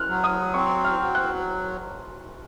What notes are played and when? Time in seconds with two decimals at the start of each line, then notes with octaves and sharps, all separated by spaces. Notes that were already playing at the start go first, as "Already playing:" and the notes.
Already playing: F6 F#6
0.08 F#3
0.24 D#6
0.54 C4 C#6
0.85 F6
1.00 F#3
1.15 F#6